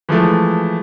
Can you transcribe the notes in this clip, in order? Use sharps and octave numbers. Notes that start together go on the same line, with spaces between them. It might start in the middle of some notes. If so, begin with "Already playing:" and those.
E3 F3 G#3 A3